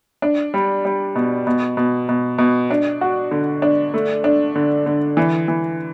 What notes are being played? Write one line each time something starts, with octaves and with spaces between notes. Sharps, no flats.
D4
G3
G3
B2
B2
B2
B2
B2
D4
F#4
D3
D4
A3
D4
D3
D3
E3
E3